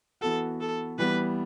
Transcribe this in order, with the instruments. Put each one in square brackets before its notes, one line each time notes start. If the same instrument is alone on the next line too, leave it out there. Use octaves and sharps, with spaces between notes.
[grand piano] E3 B3 F#4 [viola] A4
[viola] A4
[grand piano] E3 G3 B3 [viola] B4